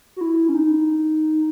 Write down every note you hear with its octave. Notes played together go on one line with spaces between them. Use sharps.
F#4
E4
C#4
D#4